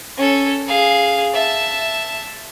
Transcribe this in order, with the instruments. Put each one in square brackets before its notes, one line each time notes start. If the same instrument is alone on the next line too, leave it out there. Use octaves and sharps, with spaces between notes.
[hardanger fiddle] C#4 A4
G#4 F5
E5 A5